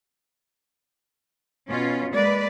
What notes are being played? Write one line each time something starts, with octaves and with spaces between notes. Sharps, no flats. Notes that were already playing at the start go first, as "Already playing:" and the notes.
B2 C#4 F4
G#3 A#3 B4 D5